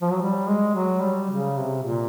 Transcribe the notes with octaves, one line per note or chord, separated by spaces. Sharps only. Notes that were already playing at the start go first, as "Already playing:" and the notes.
F3
F#3
G3
G#3
F#3
G3
C#3
C3
A#2